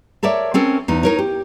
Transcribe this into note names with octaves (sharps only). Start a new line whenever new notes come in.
A4 A#4 C#5 D5 E5
C4 C#4 A4 A#4
E2 D#4
D#4 A#4 C#5
G4